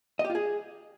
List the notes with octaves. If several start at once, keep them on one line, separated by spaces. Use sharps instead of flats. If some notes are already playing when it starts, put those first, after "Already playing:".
D#5
G4
F4
G#4